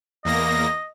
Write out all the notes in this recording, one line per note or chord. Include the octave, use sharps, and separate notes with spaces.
E2 A#3 D#5 A#6